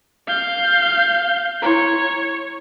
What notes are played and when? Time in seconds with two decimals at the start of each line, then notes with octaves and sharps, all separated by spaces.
0.27 F5 G6
1.62 E4 C#5 A#5